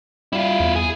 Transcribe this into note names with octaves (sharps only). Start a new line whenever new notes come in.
G3 E4 F4
E2
G#4